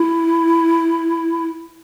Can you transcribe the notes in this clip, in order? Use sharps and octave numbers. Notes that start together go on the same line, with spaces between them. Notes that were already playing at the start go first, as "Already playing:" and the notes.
Already playing: E4